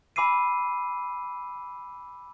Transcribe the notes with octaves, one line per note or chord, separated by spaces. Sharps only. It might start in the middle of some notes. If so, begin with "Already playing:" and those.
G#5 B5 D6 E6 C7 D#7